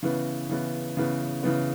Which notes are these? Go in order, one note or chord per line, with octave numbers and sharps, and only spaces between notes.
C#3 E3 B3
C#3 E3 B3
C#3 E3 B3
C#3 E3 B3